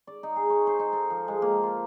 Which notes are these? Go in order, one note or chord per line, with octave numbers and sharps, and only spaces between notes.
D5
D#4
G#4
C#5
C5
D#4
A4
F3
G#3
A#3
F4